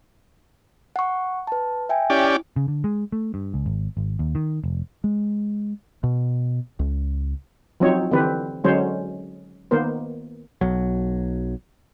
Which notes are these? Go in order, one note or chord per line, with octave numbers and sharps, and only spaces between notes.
F#5 C#6
B4 A5
E5 G5 G#5
C#4 E4 G4 D5
C#3
D3
G#3
A3
G2
C#2
G#1
G#1
D#2
D#3
F1
G#3
B2
C#2
F3 F#3 C4 D#4 C#5
D3 E3 C4 G4 B4
D3 F#3 G#3 C#4 C5 C#5
D#3 A#3 B3 A#4 C5
B1 F#3